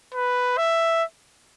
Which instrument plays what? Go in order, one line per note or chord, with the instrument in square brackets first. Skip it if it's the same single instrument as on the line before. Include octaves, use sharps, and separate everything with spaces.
[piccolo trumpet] B4
E5